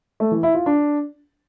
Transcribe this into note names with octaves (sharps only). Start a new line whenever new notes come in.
A3
E3
E4
F4
D4